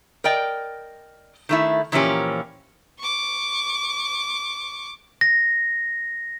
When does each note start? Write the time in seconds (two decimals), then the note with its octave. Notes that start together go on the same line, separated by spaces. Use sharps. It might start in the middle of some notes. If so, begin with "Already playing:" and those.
0.24 A#4 D5 D#5 G5
1.49 D#3 A3 E4
1.92 A#2 E3 F3 A#3 C#4 G4
3.00 C#6 D6
5.21 A#6